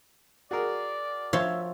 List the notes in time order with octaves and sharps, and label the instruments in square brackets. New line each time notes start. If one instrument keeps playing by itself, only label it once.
[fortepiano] F#4 G#4 A#4 [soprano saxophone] D5
[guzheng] F3 F4 C#5 [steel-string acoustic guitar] E5